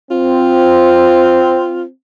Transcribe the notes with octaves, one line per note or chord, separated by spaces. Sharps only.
C4 F4